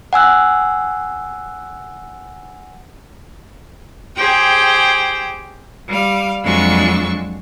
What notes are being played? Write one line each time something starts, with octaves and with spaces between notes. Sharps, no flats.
F#5 G#5 E6 F#6
G4 G#4 C5 G5
G3 F5
F2 F#3 G#3 D4 C#6 E6